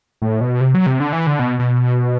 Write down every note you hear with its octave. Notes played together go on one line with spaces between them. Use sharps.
A2
B2
C3
F#3
C3
D3
E3
D3
B2
B2